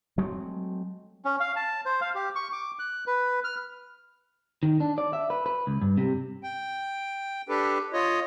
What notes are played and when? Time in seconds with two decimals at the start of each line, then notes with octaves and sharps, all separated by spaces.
0.18 F#3 G#3 A3 C4
1.25 C#4
1.40 F5
1.56 A5
1.85 C5
2.01 F5
2.15 G4
2.36 C#6
2.53 D6
2.79 F#6
3.07 B4
3.44 F6
4.63 D#3
4.80 D4
4.98 D5
5.13 E5
5.30 B4
5.46 B4
5.67 C#2
5.82 G2
5.97 C3
6.43 G5
7.49 D4 G4 A4 B4
7.93 F4 C#5 D#5